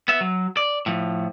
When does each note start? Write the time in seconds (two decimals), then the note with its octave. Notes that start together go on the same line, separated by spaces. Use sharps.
0.08 B3 E5
0.21 F#3
0.57 D5
0.86 A2 F3